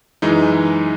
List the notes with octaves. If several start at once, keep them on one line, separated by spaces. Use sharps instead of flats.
F#2 E3 G#3 D#4